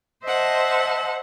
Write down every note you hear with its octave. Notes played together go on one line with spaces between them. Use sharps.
C5 D#5 E5 F#5 A5